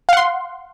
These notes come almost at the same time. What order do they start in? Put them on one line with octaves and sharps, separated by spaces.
F5 F#5 C6